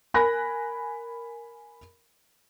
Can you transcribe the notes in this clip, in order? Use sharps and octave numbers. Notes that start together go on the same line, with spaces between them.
A#4 G#5 B5 F#6 A#6